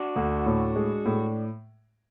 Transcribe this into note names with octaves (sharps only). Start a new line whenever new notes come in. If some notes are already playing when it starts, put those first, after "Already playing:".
Already playing: D4 F#4
D2
A2
G#3
A2